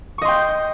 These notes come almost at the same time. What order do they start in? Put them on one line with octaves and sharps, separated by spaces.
C#6 D#5 C6 G5 G6